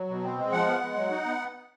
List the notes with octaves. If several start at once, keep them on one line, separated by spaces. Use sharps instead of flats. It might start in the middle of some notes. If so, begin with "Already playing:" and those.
Already playing: F#3
B2
C4
G#3
F3 F#5
B3
G#3
F#3
D#4
B3